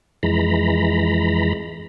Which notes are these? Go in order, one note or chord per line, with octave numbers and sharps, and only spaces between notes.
F2 E3 G#3 A#5 B5